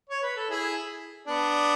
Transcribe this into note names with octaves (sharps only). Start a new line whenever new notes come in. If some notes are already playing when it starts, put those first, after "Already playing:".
C#5
B4
A4
E4 G#4
B3 D4